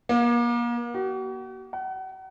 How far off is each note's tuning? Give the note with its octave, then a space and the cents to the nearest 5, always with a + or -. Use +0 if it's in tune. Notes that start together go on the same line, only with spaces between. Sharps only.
A#3 +35
F#4 +45
F#5 +35